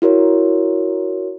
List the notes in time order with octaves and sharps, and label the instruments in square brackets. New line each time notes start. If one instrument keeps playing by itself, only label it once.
[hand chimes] E4 F#4 A#4 C#5